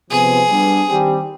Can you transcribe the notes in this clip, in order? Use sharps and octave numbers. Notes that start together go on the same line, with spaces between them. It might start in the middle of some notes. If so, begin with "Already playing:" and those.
C3 F3 B3 G#4
G3 B3 D4
D#3 G3 C4 G4